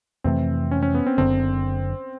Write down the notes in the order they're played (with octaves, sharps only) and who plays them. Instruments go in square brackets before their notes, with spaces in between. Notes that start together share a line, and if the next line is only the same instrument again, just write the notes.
[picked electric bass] F2 C3 E3 A3 [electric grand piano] C4
[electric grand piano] C#4
C#4
B3
C4
[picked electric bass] F#1 F#2 D3 [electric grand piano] C4